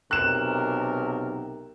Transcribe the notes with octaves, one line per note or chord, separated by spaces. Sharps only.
B1 C3 A#4 F#6 E7